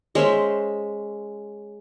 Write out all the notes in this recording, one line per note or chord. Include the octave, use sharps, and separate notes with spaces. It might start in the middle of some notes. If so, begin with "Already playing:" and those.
G#3 C#4 C5 E5